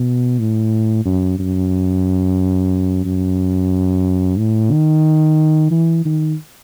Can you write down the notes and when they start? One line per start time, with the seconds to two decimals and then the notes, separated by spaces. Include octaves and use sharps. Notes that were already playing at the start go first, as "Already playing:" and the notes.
Already playing: B2
0.39 A2
1.05 F#2
1.39 F#2
3.05 F#2
4.38 A2
4.71 D#3
5.71 E3
6.05 D#3